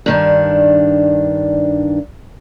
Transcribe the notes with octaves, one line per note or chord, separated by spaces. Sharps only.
G2 D#3 D4